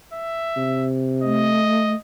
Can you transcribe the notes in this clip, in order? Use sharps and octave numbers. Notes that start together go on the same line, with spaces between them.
E5
C3
A3 D#5